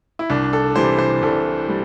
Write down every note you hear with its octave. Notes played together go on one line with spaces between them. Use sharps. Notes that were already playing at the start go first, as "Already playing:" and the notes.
E4
C2 D4
A4
C3 E3 G3 C5
C5
C2 A4
G3